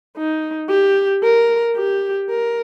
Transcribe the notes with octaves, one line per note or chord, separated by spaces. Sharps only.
D#4
G4
A#4
G4
A#4